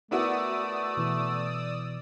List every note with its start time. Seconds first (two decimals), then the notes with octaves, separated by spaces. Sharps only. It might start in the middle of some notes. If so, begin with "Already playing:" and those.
0.11 A3 B3 E4 F#4 A#4 D5 D#6 E6
0.97 B2 E3